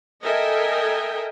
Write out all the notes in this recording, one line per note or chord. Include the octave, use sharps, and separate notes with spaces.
A4 A#4 D#5 E5 G5 G#5